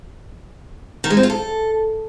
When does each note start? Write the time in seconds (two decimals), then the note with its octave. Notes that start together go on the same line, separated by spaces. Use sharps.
1.04 D#3
1.10 G#3
1.17 C4
1.23 F4
1.30 A4